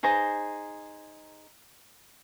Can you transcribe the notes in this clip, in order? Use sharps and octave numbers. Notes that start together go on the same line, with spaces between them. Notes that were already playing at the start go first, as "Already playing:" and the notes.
D#4 G#4 C5 A#5